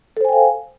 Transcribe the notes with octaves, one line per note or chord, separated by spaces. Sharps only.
A4 C5 F5 G5 G#5